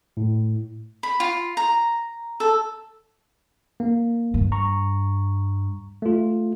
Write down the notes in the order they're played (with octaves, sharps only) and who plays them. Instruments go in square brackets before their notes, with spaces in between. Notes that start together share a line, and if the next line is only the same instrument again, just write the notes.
[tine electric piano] A2
[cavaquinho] B5
F4
A#5
A4
[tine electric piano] A#3
[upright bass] G2
[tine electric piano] A#5 C#6
A3 F4